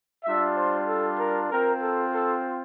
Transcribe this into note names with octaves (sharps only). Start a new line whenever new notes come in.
G3 D4 F4 E5
C5
A4
A#4
C4 F4 A#4
A4
A4